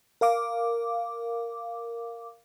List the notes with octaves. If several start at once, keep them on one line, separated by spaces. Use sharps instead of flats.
A#4 F5 D6